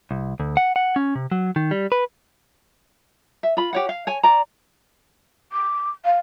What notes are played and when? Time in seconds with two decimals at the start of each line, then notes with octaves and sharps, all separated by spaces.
0.11 C2
0.40 D2
0.57 F#5
0.76 F#5
0.96 C#4
1.15 C3
1.32 F#3
1.56 D#3
1.71 G3
1.92 B4
3.43 E5
3.57 F4 B5
3.73 G4 C#5 F#5
3.89 F5
4.07 C#5 G#5
4.23 D5 A#5
5.52 D6
6.05 F5